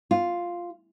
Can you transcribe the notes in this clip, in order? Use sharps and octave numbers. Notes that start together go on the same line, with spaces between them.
F4